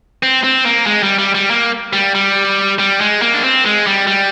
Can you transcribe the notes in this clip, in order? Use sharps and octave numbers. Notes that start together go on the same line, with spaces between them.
C4
C4
A#3
G#3
G3
G3
G3
A#3
G3
G3
G3
G#3
A#3
D4
C4
G#3
G3
G3